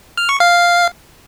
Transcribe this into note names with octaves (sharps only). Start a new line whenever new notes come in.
F6
C#6
F5